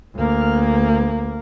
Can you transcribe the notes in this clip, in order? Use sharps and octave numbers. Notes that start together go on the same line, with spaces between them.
D2 A#3